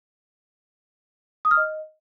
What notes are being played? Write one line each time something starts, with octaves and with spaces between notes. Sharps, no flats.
D#6
F6
D#5